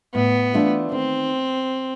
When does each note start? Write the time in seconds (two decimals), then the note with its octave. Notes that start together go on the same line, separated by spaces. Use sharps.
0.14 A2 B3
0.54 E3 A3 D4 F4
0.92 D#3 C4